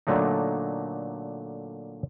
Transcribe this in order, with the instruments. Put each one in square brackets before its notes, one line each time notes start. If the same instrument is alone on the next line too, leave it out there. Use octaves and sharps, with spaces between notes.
[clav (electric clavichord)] A#2 D3 F#3 A3 D#4